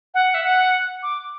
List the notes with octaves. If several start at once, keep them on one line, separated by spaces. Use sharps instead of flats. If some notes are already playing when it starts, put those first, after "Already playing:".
F#5
E5
F#5
D6